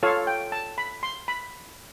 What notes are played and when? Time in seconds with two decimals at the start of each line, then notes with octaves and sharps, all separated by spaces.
0.03 F4 A4 C#5 F5
0.27 G5
0.52 A5
0.78 B5
1.03 C6
1.28 B5